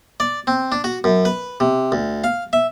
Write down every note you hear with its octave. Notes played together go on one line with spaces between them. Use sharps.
D5
C4
D4
F#4
F#2
B4
C3
D2
F5
E5